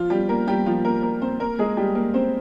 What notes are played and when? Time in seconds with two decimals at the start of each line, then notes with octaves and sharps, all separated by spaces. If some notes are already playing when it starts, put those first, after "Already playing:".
Already playing: F3 F4
0.10 G3 G4
0.29 A#3 A#4
0.48 G3 G4
0.66 F3 F4
0.85 A#3 A#4
1.03 A#3 A#4
1.22 C4 C5
1.40 A#3 A#4
1.59 G#3 G#4
1.77 G3 G4
1.95 A#3 A#4
2.14 C4 C5